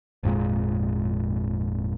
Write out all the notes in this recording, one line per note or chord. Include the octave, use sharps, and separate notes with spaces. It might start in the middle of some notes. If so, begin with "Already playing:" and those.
G#1 F2 A#2 G#3